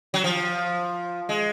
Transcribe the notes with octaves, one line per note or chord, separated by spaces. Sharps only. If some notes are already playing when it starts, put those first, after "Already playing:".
F#3
F3
G#3